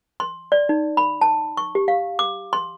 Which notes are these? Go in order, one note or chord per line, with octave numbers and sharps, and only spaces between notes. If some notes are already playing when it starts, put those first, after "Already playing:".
C6
D5
D#4
B5
A5
C#6
G4
F5
D6
C6